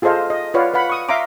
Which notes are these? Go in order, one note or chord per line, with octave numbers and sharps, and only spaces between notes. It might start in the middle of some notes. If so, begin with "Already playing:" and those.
F4 G#4 A4 C5 D#5 F5
D#5
F4 B4 C#5 D5 F5 F#5
B4 F5 F#5 B5
C#6 D#6
E5 F5 A#5 C6 D6